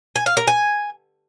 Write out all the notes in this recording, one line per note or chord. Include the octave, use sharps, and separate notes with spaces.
G#5
F5
A#4
G#5